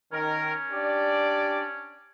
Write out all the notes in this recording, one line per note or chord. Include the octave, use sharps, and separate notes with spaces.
D#3 C#4 A#4
D4 G4 D5